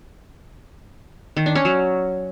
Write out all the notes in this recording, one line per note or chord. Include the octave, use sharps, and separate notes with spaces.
D#3
D4
C#4
F#3